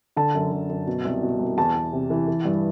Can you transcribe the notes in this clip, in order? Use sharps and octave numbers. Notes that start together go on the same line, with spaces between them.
D3 A5
F#2
D3
F#2
B2
C2
B2
C2
E2 A5
E2
C3
E3
E3
G2